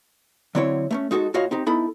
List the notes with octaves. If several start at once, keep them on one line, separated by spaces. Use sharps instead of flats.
D3 F#3 C4 E4 C#5
A3 A#3 C#4
G#3 D#4 F#4 G#4 A4
A2 F4 F#4 C#5 D#5 F5
C4 D#4 G4
B3 D#4 E4 A4 B5